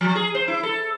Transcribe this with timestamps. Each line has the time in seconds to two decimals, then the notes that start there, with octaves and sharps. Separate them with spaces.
0.01 F3
0.15 G#4
0.35 C5
0.48 E4
0.63 A4